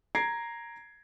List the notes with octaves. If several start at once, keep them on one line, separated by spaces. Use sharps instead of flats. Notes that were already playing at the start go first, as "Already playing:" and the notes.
A#5 G#6 A#6 C7 D7